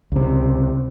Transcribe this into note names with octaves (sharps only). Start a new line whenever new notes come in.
C#2 C3